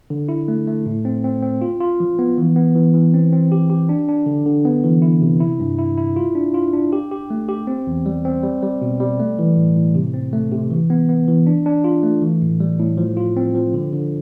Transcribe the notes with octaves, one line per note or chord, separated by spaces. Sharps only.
D3
E4
A3
A3
A2
C4
C4
C4
F4
F4
F3
B3
E3
B3
E3
E3
C4
C4
G4
G4
D4
D4
D3
D3
B3
E3
E4
C3
E4
G2
E4
E4
F4
D4
F4
D4
G4
G4
A3
G4
C4
E2
G3
C4
G3
G3
B2
G3
A3
E3
A2
A2
C3
C4
A3
C3
E3
B3
B3
E3
D4
D4
F4
A3
E3
A2
G3
A2
F3
F4
C4
F3
D3
D3